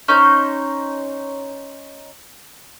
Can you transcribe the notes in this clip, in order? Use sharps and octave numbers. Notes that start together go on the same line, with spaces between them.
C#4 D#4 C5